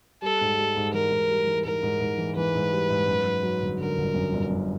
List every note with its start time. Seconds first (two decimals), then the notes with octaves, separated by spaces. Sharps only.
0.22 G3 A4
0.41 G#2
0.59 G3
0.77 G#2
0.94 E3 A#4
1.12 G#2
1.30 G3
1.47 E3
1.65 G#2 A#4
1.83 G#2
2.01 G#2
2.18 E3
2.36 E3 B4
2.55 G#2
2.72 G3
2.90 G#2
3.07 F#2
3.26 F#3
3.43 F#3
3.62 G1
3.80 D3 A#4
3.97 G1
4.15 F#2
4.33 G1
4.51 F#2